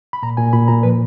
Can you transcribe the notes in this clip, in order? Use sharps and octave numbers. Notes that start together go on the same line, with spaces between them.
B5
A#2 A#5
A#2 G#5
A#2 B5
A#2 A#5
F3 B4